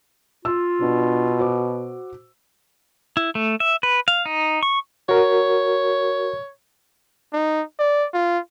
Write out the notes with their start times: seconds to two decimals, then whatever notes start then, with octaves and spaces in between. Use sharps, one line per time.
0.45 F4 E6
0.81 B2 D4
1.39 F#4 C5 D6
3.17 E4
3.35 A3
3.60 E5
3.83 B4
4.08 F5
4.26 D#4
4.63 C#6
5.09 F#4 A#4 C#5
7.33 D#4
7.79 D5
8.14 F4